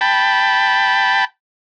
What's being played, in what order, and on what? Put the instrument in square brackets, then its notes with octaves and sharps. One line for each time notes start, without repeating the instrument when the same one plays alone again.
[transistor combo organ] G5 A5 B5